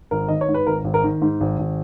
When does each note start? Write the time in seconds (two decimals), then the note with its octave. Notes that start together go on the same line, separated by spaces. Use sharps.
0.11 G#1 A#4
0.28 D#3 D#5
0.41 C#5
0.48 G#2
0.54 B4
0.67 G#1 A#4
0.84 G#1
0.94 A#4
1.04 D#3
1.22 G#2
1.40 G#1
1.59 G#1